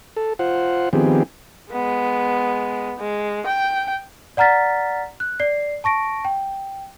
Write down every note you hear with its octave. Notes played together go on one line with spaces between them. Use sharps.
A4
F4 C5 F#5
D#3 F3 B3 C4 G4 G#4
G#3 B3
G#3
G5
D5 F#5 A#5 F6 A6 B6
F#6
D5 C7
A5 C#6 A#6 D7
G5